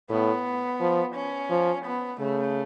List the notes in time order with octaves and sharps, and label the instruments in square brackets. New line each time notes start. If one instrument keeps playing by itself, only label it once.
[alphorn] A2 [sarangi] B3
[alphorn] F3
[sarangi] C#4
[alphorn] F3
[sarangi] B3
[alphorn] C#3 [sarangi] A3